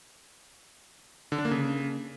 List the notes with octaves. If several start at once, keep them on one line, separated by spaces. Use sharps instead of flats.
D3
D4
A#3
C#3